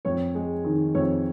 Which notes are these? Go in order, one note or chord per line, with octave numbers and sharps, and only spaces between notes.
F2 C#5
G#3
D#3
F2 C#5